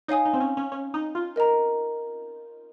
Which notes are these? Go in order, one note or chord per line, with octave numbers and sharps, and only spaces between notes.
D#4 C#5 F5 G#5 D#6
D#4
C4
C#4
C#4
C#4
D#4
F4
A#4 D#5 A#5